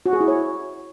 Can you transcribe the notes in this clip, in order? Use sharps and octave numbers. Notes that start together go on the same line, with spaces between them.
F#4
G#4
E4
C#5